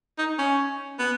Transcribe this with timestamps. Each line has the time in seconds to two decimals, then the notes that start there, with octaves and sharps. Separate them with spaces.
0.18 D#4
0.38 C#4
0.99 B3